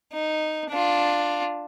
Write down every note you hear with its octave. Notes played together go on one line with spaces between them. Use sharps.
D#4
D4 F4